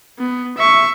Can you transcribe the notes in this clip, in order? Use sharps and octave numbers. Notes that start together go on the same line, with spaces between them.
B3
E5 C#6